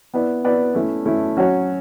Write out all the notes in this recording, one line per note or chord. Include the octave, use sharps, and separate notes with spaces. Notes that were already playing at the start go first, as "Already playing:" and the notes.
B3 E4 B4 D5
B3 E4 B4 D5
A3 C#4 E4
A3 C#4 E4
F#3 C#4 F#4 C#5